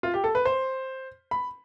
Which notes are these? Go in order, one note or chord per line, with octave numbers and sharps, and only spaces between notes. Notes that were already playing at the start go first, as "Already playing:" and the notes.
F4
G4
A4
B4
C5
B5